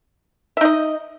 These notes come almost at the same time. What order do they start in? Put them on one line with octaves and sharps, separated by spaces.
E5 D#4 D#5